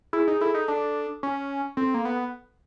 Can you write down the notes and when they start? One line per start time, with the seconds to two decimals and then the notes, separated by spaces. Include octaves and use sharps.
0.13 E4 G#4
0.28 D#4
0.41 E4 A4
0.54 D#4
0.68 D4 A4
1.23 C#4
1.77 C4 A4
1.94 A#3
2.05 B3